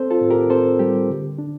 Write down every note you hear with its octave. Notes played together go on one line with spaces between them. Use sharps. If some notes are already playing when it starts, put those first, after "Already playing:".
Already playing: C4 A4 C5
F4 A4
A2
G4 A#4
C4 A4 C5
G3 G4
D3
D4